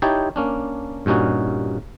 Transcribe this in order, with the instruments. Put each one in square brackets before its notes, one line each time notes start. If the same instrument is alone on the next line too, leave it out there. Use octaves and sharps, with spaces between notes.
[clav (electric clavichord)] D#4 E4 G4 C#5 G5 A5
A#3 C#4 D4
G2 A#2 C#4 D#4 F#4